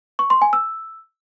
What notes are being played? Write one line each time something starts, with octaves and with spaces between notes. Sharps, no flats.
C#6
C6
G#5
E6